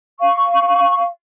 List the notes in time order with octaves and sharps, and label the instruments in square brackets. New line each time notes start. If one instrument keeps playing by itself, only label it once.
[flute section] F5 C#6